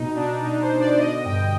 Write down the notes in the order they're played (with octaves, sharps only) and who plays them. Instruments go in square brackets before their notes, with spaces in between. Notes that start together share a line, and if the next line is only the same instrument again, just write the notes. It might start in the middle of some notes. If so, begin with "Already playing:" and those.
Already playing: [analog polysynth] B2 D#4
B2 D4
B2 D#4
C5
B2
D5
D3 D#5
G2 G5